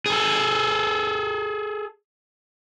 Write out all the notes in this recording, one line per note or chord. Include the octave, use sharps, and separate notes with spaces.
G#4 A4